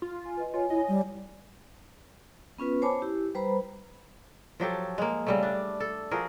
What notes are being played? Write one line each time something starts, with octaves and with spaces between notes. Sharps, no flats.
F4
G#5
B4 D#5
F4 C#5 G#5
E4 D#5
G3
B3 C#4 F4 B4
C5 C#5 G#5 A5 B5 D6
E4 G4
G3 B4 C5 A#5 B5
F3 F#3 G4 A4
G#3 A#3
C#3 G3 A3
D4
A4
F3 F#4 G#4 A#4